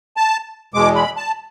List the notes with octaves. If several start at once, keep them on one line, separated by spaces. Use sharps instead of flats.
A5
E2 B2 G#3 D6
B5
A5